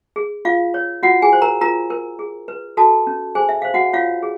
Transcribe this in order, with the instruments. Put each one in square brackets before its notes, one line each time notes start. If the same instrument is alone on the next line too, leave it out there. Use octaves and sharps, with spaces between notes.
[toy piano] G#4
F4 F5
C#5
F4 F#4 F#5
G#4 G#5
C5
A#4 A#5
F4 A#4 A#5
A#4
G#4
B4
F#4 A4 A5
C#4
G#4 C5 G#5
E5
C5 F5
F#4 F#5
F4 C#5 F5
G#4